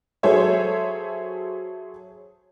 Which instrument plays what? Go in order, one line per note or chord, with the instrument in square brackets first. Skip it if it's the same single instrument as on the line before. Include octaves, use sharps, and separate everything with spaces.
[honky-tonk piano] F#3 G#4 A4 C5 C#5 E5